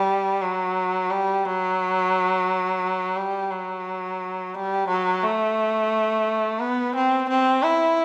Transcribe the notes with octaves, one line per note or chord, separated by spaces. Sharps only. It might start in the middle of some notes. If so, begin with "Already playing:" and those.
Already playing: G3
F#3
G3
F#3
G3
F#3
G3
F#3
A3
B3
C4
C4
E4